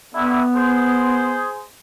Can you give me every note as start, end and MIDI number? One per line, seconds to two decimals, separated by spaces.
0.14 0.42 43
0.14 0.42 50
0.14 1.45 59
0.14 0.42 64
0.55 1.65 68
0.55 1.65 72